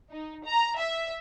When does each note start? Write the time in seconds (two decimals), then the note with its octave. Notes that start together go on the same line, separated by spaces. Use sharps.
0.10 D#4
0.46 A#5
0.78 E5